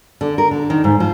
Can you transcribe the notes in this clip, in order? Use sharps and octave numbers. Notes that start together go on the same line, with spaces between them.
D3
A#4
D3
D#3
G#2
F3